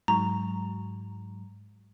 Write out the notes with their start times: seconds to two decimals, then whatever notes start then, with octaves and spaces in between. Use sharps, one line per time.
0.08 G#2 F#3 A#5 C#6